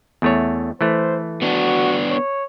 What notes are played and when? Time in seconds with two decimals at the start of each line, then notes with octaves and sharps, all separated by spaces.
0.22 E2 A3 C#5
0.81 E3 A3 C5
1.42 B3 D4 F#4
2.10 C#5